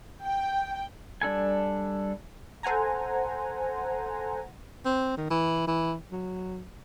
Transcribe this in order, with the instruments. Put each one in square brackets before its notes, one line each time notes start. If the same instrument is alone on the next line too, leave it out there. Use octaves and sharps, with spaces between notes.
[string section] G5
[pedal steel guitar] G3 D4 A4 G#5
[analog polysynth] A4 C5 F#5 G#5 A#5
[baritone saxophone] C4
D#3
E3
E3
F#3